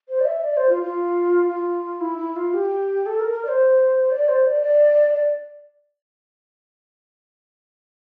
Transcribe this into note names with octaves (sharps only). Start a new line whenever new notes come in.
C5
D5
E5
D5
C5
F4
F4
F4
E4
E4
F4
G4
A4
A#4
A#4
D5
C5
D5
C5
D5
D5
D5